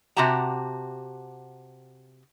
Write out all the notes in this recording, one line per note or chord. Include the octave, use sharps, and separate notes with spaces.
C3 F#4 G4 F#5 A5 A#5